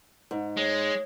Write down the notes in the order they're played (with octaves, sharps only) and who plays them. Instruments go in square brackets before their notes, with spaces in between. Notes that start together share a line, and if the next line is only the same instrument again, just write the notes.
[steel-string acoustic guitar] G#2
[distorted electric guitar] G#3 [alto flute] C#5